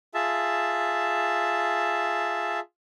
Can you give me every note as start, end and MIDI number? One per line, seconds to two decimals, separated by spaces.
0.14 2.60 65
0.14 2.60 68
0.14 2.60 76
0.14 2.60 81